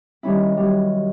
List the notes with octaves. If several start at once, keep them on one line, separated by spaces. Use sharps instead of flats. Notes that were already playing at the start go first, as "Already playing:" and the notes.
D#3 G3 C#4 E4
F#3 G3